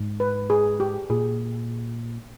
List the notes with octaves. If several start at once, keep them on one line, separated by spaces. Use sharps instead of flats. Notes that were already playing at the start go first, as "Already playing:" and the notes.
Already playing: G#2
B4
G#4
G4
A#2 G#4